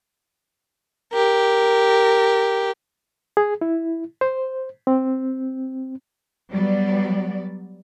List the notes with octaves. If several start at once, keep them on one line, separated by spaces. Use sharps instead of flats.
G4 A#4
G#4
E4
C5
C4
F#3 G3 B3 D5